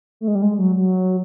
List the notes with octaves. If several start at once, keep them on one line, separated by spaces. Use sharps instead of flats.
A3
G#3
G3
G#3
F#3
F#3